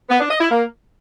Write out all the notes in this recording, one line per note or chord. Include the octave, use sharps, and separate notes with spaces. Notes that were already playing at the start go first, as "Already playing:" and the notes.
B3
D4
D#5
E4
A#3